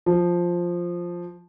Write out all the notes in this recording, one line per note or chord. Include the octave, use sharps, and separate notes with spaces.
F3